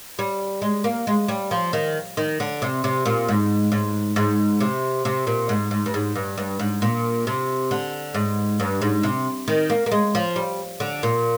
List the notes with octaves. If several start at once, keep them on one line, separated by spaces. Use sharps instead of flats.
G3
G#3
A#3
G#3
G3
F3
D#3
D#3
D3
C3
C3
A#2
G#2
G#2
G#2
C3
C3
A#2
G#2
G#2
G2
G#2
G2
G2
G#2
A#2
C3
D3
G#2
G2
G#2
C3
D#3
A#3
A#3
G#3
F3
G3
D3
A#2